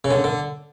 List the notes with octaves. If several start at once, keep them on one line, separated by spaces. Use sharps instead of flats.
C#3
D3
D3